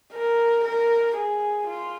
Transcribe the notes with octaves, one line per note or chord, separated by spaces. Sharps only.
A#4
A#4
G#4
F4